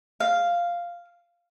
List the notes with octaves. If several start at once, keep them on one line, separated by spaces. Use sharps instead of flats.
F5